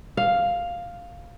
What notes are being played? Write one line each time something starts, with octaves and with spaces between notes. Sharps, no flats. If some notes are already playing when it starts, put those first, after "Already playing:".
F5